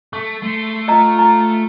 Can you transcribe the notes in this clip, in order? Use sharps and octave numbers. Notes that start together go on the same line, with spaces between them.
A3 C#6
A3 C6
F4 D#5 A#5
A#5